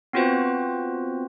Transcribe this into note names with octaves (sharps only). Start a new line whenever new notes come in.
B3 C4 F4 F#4 B4 C5